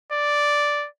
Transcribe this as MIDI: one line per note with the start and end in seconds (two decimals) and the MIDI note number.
0.12 0.88 74